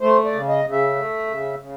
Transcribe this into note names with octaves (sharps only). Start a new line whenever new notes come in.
A3 C5
D5
C#3
D#5
C#3
E5
A3
C#3
C#3